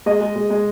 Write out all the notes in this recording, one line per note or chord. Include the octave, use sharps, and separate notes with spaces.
G#3 D#5
G#3
G#3
G#3